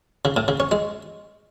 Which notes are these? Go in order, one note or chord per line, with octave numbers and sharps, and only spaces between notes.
C#3
A2
C#3
C#4
G#3